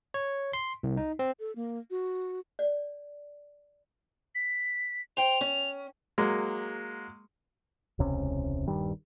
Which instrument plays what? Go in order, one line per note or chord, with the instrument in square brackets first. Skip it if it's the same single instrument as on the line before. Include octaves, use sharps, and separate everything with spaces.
[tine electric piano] C#5
C6
C2
D#4
C4
[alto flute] A4
A#3
F#4
[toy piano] D5
[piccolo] B6
[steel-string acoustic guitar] C5 G5 [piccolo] F7
[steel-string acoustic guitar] C#4
[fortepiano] F#3 G#3 A#3
[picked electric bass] E1 C#2 C3 C#4
D#1 G2 D#3 G3